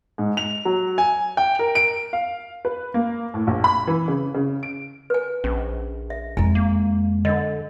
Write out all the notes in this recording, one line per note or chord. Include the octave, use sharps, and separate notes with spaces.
G#2
F7
F#3
G#5
G5
A#4
D7
F5
B4
A#3
A2
A#1
B5
E3
C#3
C#3
D7
B4 G#5
A#1 C#4
E5
F2 G#3 E4 G#5
A#3
D3 D4 D#5